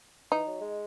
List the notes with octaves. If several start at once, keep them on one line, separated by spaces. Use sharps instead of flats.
E3 D#4
F#3
G#3